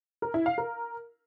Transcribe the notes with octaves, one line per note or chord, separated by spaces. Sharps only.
A#4
E4
F5
A#4